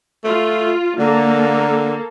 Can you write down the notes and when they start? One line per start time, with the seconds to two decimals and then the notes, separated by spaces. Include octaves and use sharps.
0.24 A3 F4
0.99 D3 A#3 A4